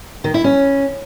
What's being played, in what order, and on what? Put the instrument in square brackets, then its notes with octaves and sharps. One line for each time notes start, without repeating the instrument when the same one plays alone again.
[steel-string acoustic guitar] D#3
E4
C#4